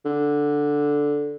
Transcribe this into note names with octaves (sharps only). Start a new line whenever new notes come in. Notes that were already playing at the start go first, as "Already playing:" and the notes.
D3